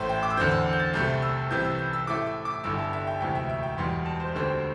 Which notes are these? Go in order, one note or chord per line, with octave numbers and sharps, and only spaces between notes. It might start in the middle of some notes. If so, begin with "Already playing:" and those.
Already playing: A1 A2 A3 E4 C5
G5
D6
E6
E2 D3 C4 G6
E6
G6
A6
C2 C3 A3 G6
E6
C2 C3 E3 G6
E6
G6
E6
A2 A3 E4 D6
E6
D6
G1 G2 D3 G3 E4 E6
A5
E5
G5
E1 D2 C3 E3 G5
E5
E5
G5
E1 E2 E3 G3 C6
A5
C5
E1 D2 D3 G3 C4